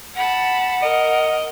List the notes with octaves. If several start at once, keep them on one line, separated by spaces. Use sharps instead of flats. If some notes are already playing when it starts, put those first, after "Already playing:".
F#5 A5 B5
A#4 D#5